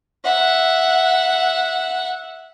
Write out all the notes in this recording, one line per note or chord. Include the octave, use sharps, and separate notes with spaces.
E5 F#5